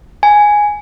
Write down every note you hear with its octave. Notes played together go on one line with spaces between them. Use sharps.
G#5